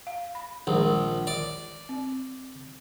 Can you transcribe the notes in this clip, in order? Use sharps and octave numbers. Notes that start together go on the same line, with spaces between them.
F5
B5
A#1 D#3 G#3
D5
C4